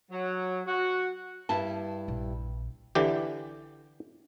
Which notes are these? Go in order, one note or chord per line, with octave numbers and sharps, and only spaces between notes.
F#3
F#4
G2 E4 A5
A#1
D3 E3 G4